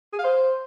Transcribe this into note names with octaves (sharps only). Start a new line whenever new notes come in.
G#4
F5
C5